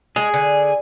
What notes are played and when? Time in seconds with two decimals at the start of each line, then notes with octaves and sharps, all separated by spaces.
0.16 G#3 G#4
0.34 D3